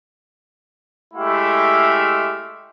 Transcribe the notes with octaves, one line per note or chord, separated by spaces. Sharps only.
G#3 A3 E4 G4 E5 F5